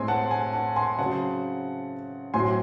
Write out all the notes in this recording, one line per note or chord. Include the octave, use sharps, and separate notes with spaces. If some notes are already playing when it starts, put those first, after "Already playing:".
Already playing: A2 G#3 C4 G#5 C6
F#5 A5
G#5
F#5 A5
G#5 C6
C#3 F#3 C4 F#5 A5
A2 F#3 C4 G#5 C6